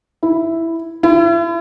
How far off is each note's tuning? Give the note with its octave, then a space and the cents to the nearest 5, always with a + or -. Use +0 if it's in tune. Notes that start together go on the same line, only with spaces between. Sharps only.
E4 +0
E4 +40